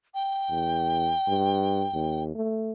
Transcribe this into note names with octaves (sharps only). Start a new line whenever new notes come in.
G5
E2
G2
D#2
A3